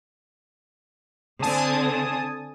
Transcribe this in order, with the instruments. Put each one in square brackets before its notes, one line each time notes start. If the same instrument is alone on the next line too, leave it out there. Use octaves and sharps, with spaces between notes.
[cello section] D3 C4 [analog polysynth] G#5 A5 D#6